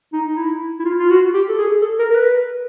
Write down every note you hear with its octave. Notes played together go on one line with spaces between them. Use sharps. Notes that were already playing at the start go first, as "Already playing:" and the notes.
D#4
D#4
E4
E4
F4
F4
F#4
G4
A4
G#4
A4
A#4
A#4
B4